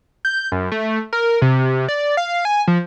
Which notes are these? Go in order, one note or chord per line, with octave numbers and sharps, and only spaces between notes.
G6
F#2
A3
A#4
C3
D5
F5
G#5
F3